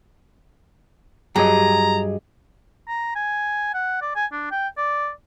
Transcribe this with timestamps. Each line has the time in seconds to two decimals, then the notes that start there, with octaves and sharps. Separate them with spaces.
1.36 G2 F#3 G4 G#4 D#5 A#5
2.88 A#5
3.15 G#5
3.74 F#5
4.01 D5
4.16 G#5
4.32 D4
4.51 G5
4.77 D5